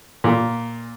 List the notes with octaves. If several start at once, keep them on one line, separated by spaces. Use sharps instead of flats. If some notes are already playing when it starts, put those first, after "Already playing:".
A#2